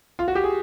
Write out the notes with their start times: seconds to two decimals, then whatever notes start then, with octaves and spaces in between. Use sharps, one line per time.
0.19 F4
0.28 F#4
0.35 G4
0.44 G#4